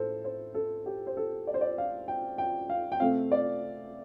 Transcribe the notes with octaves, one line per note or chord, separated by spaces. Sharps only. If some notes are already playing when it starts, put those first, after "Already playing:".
Already playing: A2 A4 C5
C5
A4
G4
C5
A4
D5
C5
D5
F5
G5
G5
F5
G5
C3 A3 C4 F5
D5